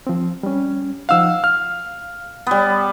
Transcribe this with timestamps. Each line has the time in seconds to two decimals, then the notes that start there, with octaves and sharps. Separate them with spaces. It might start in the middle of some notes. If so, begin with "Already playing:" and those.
0.07 F3 C4
0.43 G3 C#4
1.09 F3 D#4 F5 F#5 E6
1.44 F5 F6
2.47 G3 B3